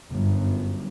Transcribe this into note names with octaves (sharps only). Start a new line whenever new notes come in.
G1 F#2